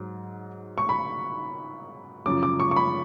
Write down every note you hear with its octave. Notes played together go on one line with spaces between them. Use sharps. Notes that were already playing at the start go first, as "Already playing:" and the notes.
Already playing: G#2 F#3
C#6
B5
F#2 C#3 F3 D6
D6
C#6
C#6
B5